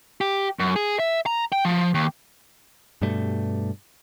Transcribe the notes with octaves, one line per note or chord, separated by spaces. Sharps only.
G4
F#2
G#4
E5
A#5
G5
F3
D#2
G2 B2 G3 A3